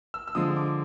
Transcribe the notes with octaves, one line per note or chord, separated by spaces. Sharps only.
E6
E6
D3 F3 G#3 D#6
D6